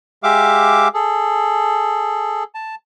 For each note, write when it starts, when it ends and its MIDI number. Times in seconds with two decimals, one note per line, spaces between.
0.23 0.88 56
0.23 0.88 67
0.23 0.88 76
0.23 0.88 77
0.23 0.88 86
0.94 2.44 68
0.94 2.44 69
2.55 2.75 81